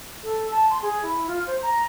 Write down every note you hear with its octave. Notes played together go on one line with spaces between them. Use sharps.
A4
A5
C6
G#4
E4
F4
C5
A#5